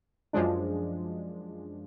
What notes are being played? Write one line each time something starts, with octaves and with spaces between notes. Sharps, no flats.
F#2 F3 G#3 D4